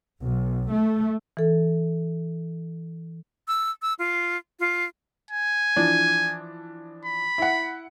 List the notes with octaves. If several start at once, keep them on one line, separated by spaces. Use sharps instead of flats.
B1
A3
E3 A4
E6
E6
F4
F4
G#5
E3 F3 D4
B5
E4 F#5